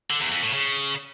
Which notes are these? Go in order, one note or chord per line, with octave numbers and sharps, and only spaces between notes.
D3
E2
F2
A2
C#3